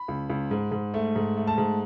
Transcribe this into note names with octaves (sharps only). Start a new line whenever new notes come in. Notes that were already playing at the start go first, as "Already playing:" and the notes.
Already playing: B5
C#2
C#2
G#2
G#2
A3
G#2
A3
A5
G#2